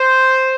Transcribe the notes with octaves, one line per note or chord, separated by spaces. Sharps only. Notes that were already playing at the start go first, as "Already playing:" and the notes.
Already playing: C5